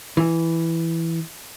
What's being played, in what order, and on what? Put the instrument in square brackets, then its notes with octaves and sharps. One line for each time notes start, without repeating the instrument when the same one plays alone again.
[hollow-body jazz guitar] E3